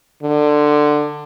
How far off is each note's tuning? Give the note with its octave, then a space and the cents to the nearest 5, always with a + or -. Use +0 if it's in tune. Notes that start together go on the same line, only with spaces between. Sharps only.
D3 +15